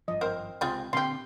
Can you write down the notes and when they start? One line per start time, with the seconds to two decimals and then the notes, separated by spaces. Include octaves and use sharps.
0.08 G#1 G2 F3 D#5
0.21 C4 A#4 C5
0.61 C#2 C3 C4 F4 G#4
0.93 A#2 D3 G3 C4 G4 C6